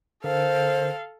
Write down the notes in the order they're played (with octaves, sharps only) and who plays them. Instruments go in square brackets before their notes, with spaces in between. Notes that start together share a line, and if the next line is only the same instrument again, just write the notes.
[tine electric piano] D3 A#4 [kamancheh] A4 F5 [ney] C5